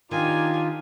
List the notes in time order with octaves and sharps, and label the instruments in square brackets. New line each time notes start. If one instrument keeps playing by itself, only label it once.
[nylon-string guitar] D#3 [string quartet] D4 D#4 G4 [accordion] F4 [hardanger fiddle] G#5